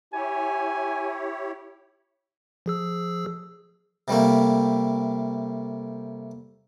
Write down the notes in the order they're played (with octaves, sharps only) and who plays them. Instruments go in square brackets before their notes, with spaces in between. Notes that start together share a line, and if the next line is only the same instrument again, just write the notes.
[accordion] E4 G4 C#5 [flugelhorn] G#5
[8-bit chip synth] F3 G#4 E6
[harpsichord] C3 G3 A3 A#3